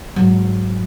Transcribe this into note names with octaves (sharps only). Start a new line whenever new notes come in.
G#2 F#3